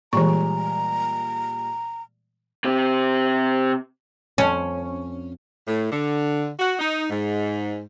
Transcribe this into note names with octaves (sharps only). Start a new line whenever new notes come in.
A#2 E3 G3 G#3 A#5 C#6
C3 G4
F2 C#4
A2
D3
F#4
D#4
G#2